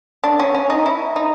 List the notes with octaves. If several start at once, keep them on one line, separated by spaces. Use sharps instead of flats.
D4
C#4
C#4
D#4
E4
D#4